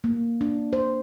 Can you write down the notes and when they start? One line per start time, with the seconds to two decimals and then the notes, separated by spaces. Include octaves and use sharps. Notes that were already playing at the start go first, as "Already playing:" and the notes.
0.04 A#3
0.41 D4
0.73 C5